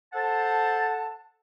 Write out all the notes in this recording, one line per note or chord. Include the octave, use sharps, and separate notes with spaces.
A4 C5 F#5 A5